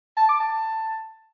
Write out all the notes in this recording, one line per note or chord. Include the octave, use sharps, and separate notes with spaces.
A5
D6
A5